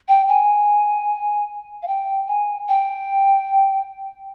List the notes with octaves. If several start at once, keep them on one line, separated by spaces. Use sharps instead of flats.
G5
G#5
F5
G5
G#5
G5